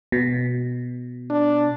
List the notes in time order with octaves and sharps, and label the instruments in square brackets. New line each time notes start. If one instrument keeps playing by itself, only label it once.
[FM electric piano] B2
[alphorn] D4